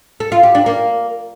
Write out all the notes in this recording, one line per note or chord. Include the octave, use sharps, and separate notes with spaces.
A4
F4
G4
D4
A#3